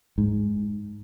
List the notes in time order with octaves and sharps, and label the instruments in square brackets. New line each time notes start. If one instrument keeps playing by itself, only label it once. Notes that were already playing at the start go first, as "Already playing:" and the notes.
[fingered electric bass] G#2